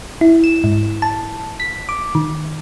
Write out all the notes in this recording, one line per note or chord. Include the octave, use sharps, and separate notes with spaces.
E4
E7
G#2
A5
B6
D6
D#3